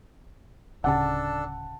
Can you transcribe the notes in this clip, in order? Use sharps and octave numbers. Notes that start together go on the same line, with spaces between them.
D1 C#3 D4 A4 F#5 A5